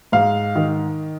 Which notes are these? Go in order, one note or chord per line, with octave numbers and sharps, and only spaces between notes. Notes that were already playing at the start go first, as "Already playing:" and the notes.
G#2 F5
D#3